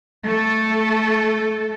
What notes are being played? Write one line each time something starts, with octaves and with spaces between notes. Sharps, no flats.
A3 A4